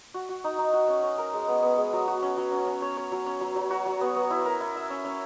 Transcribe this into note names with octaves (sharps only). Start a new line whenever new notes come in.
F#4
F#4
D#4
D#4
F#4
C#4
C#4
A#4
G#3
B3
B3
G#3
F#3
F#4
C#4
F#3
C#4
C#4
C#5
C#5
F#3
C#4
F#3
F#3
F#4
F#3
B3
B3
E4
A#4
E4
E5
C#4
C#4